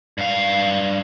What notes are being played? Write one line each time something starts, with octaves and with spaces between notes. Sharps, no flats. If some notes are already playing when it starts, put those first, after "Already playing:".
G2 F5